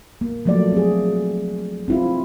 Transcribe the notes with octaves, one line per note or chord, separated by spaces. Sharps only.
A#3
F3 F#3 A3 A#3 D5
C4 G#4
C4 E4 F4